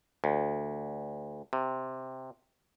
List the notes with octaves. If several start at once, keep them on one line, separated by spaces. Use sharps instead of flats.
D2
C3